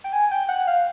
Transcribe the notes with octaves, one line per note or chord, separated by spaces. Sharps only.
G5
G#5
G5
F#5
F5